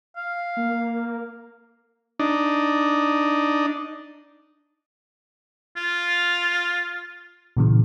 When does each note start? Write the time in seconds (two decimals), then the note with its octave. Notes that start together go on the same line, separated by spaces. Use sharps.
0.16 F5
0.57 A#3
2.19 D4 D#4
5.77 F4
7.57 A#2 C#3 E3